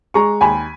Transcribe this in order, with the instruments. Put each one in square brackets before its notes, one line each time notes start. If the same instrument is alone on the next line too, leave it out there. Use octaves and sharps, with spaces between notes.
[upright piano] G#3 A#5 C#6
D#2 G#5 B5